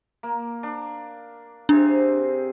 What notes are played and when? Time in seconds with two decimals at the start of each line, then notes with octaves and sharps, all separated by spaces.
0.23 A#3
0.63 D4
1.69 C3 C4 D4 G#4